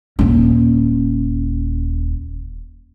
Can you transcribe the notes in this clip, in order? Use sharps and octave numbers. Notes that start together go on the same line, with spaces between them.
D#1 C#4